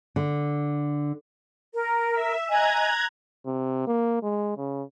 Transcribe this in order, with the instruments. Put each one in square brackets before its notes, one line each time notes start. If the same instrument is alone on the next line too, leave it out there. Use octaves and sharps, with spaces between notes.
[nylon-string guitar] D3
[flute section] A#4
[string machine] E5
[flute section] D#5 G#5 [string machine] A#5 F#6 G#6
[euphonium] C3
A#3
G#3
C#3